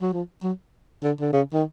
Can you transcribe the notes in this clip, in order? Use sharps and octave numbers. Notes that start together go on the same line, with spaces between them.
F#3
F3
F#3
D3
D3
C#3
D#3